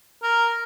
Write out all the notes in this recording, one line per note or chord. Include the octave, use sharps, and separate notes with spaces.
A#4